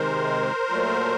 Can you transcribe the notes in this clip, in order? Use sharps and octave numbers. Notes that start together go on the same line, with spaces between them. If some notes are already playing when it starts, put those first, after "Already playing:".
Already playing: C3 D#3 G#3 A#4 C5
A#2 F#3 A3